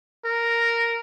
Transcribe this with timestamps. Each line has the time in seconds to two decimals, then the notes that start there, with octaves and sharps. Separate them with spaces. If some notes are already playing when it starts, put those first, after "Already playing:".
0.25 A#4